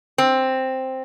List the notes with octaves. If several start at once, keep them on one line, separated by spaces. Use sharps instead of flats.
C4